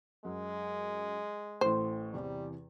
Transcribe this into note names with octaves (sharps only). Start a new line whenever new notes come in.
F#2 G#3
A1 A2 C5
E2 C3 E3 G3